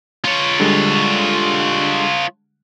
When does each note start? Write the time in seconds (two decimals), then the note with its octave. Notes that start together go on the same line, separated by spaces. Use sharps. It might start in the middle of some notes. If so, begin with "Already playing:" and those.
0.24 F4 C#5
0.60 D3 G3 G#3